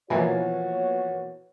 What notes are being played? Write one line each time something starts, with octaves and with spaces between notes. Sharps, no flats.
B2 E3 F3 A#3 F#4 B4 C#5 G#5